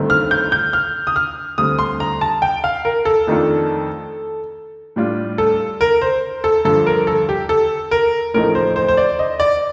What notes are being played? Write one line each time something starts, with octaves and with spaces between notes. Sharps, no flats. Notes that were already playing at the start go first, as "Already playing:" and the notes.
Already playing: G1 G2 D#3 A3 C4
F6
G6
G6
F6
D#6
F6
D2 D3 G3 C4 D#6
C6
A#5
A5
G5
F5
A#4
A4
F2 D#3 A3 D4 F4
A2 G3 D4 F4
A4
A#4
C5
A4
G2 D3 F3 A4
A#4
A4
G4
A4
A#4
A1 A2 F3 A3 D#4 A#4
C5
C5
C5
D5
D#5
D5